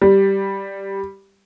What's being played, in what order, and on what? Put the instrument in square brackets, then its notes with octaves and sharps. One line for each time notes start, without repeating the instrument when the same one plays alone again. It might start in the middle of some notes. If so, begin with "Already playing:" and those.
[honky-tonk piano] G3